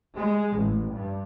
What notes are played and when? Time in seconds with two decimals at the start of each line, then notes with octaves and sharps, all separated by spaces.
0.16 G#3
0.56 A1
0.93 G2